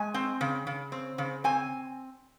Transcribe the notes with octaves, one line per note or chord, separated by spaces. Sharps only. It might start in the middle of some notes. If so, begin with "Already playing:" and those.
Already playing: G#3 G#5
C4
C#3
C#3
C4
C#3
C4 G#5